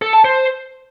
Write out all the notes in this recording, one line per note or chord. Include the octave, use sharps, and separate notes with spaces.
A4
A5
C5